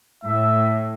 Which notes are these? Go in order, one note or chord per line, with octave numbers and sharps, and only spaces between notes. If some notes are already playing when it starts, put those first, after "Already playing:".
A2 E5